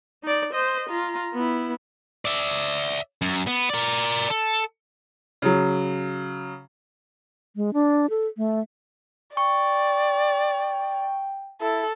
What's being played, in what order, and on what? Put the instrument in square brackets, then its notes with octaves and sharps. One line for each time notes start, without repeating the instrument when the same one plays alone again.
[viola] D#4 D5
C5 D#5
F4 A#5
B3 E4
[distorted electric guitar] D5 E5
F#2
B3
A#4 D5
A4
[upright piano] C#3 F#3
[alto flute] G#3
D4
A4
A3
[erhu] D5 [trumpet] G5 [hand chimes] C#6
[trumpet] E4 [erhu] A4